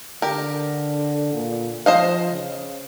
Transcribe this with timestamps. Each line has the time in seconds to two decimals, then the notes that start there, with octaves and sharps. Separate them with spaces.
0.22 D3 G4 A#4
1.34 A#2
1.86 F3 C5 D#5 F5
2.31 C#3